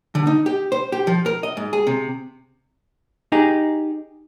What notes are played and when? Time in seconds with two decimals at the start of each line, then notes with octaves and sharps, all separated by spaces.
0.15 D3
0.27 D#4
0.46 G4
0.72 C5
0.92 G4
1.07 F3
1.26 A#4
1.43 D#5
1.57 G#2
1.73 G#4
1.87 C3
3.32 D#4 G4 G#4